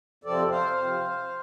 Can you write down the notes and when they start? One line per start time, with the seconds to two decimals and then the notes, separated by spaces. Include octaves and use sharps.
0.24 F2 C3 F3 C4 A4 D5
0.51 C5 F5
0.77 C3 F3 C4